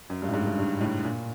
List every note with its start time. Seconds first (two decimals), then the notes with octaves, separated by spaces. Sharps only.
0.10 F#2
0.22 G2
0.29 A2
0.33 G#2
0.46 G2
0.58 G2
0.81 A2
1.04 A#2